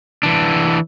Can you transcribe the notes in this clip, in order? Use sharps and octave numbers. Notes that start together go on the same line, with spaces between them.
E3 D4